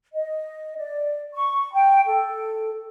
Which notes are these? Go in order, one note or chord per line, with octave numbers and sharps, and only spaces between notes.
D#5
D5
C#6
G5
A4